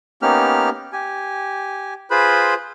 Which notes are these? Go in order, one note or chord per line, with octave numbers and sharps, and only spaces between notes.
A#3 B3 C#4 D#4 G4 F6
G4 G#5
F4 G#4 B4 C5 B5